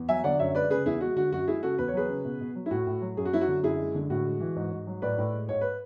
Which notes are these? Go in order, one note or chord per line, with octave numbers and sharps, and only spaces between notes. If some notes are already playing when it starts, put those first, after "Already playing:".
Already playing: E2
F#3 E5 G#5
D3 D5 F#5
F#2 C#5 E5
G#3 B4 D5
C#3 G#4 B4
E2 E4 G#4
G#3 F#4
D3 F#4
F#2 F#4
G#3 E4 G#4
C#3 F#4 A4
E2 B4
C#5
F#3 G#4 B4
C#3
B2
B2
F#3
E4
A2 F#4
A2
F#3
F#2 G#4
F#4
F#3 E4
F#4
D3
F#2 E4 G#4
G#3
D3
A2 F#4
G#3
E3
G#2
G#2
F#3
A2 B4 D5
A2
G#3
G#2 C#5
B4